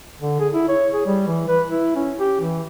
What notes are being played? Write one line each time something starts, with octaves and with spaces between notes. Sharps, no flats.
D3
G#4
E4
C#5
G#4
G3
E3
B4
E4
C#4
G4
E3